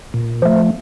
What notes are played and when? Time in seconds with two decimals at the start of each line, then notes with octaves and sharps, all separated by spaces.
0.14 A#2
0.42 F3 A3